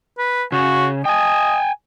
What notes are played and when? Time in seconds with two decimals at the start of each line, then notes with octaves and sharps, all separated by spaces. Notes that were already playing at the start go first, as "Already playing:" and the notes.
0.18 B4
0.52 C#3 F#4
1.05 D#5 G5 G#5